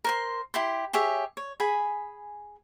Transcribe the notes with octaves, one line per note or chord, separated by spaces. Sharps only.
A#4 C5 C6
E4 G4 C6
G4 G#4 C#5 E5
C#5
G#4 G#5 B5